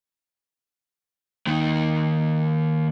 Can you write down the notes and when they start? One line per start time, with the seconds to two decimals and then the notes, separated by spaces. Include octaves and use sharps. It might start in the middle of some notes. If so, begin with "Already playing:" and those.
1.47 D#2 D#3